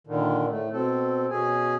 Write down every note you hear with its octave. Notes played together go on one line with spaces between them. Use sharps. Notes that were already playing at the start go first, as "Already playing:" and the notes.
A#2 D3 D#3
A2 A3
B2 C4 A4
B2 C#4 G#4 G#5